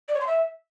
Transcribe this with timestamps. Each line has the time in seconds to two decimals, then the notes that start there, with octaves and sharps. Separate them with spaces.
0.08 D5
0.14 C#5
0.21 C6
0.27 E5